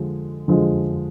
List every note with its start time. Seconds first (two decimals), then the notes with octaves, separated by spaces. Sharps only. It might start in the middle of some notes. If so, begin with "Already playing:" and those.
Already playing: D3 F3 G#3
0.48 D3 F3 G#3